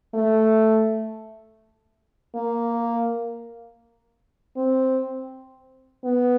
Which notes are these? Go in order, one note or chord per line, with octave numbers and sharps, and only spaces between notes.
A3
A#3
C4
B3